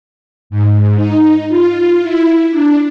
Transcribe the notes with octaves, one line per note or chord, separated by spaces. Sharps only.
G#2
D#4
F4
E4
D4